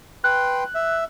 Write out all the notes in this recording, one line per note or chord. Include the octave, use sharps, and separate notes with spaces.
B4 G5 C6 F#6
E5